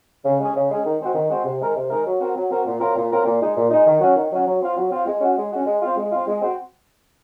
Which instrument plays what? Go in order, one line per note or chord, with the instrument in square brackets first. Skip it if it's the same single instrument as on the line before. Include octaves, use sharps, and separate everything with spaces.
[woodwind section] C#3
G#3 C#4 G#4
C#3
G#3 C#4 G#4
D#3
G#3 C4 F#4
D#3
G#3 C4 F#4
C3
D#3 G#3 D#4 A#4
C3
D#3 G#3 D#4 A#4
F#3
C4 F#4 A#4
F#3
C4 F#4 A#4
A#2
F#3 C4 F4 A#4
A#2
F#3 C4 F4 A#4
A#2
G#3 D#4
A#2
G#3 D#4
D#3
F#3 C#4 F#4
D#3
F#3 C#4 F#4
F#3
C4 F4
F#3
C4 F4
G#3
C#4 F#4
G#3
C#4 F#4
G#3
C4 F4
G#3
C4 F4
G#3
C4 F#4